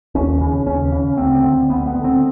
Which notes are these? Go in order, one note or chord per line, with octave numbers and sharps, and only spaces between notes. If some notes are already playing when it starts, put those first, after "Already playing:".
D#2 C#4
C#3
D#2 C#4
C#3 C#4
D2 C4
D3
D2 B3
B3
D3
C4